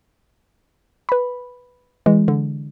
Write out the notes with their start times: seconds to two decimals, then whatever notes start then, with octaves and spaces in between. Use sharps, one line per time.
1.09 B4 B5
2.06 E3 G#3
2.28 D3